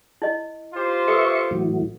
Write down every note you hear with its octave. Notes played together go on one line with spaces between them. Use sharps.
E4 D#5
F4 G4 C5
A4 B4 E5 C#6 D#6
A2 E3 F#3